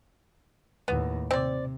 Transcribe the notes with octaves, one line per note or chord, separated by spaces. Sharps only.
D#2 A2 B3
C3 C4 D5